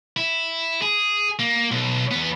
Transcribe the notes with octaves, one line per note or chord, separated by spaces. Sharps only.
E4
G#4
A#3
B1
E2 B3